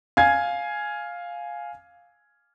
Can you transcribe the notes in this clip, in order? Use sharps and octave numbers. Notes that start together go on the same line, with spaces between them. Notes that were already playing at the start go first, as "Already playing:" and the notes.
F5 G#5 G#6